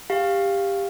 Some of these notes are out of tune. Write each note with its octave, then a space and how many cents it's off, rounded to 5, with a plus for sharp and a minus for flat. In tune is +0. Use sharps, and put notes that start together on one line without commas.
G4 +15 F5 +0